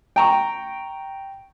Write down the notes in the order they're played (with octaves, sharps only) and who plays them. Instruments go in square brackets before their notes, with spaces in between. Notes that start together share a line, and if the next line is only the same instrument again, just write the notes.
[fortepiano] G5 A#5 C#6